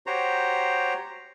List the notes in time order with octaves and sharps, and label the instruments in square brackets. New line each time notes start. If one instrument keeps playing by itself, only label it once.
[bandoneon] F#4 G4 C5 C#5 A#5